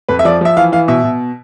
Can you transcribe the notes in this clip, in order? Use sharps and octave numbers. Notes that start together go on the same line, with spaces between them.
F2 B4
E5
F3 D5
F3 E5
E3 F5
E3 F5
B2 E5
B2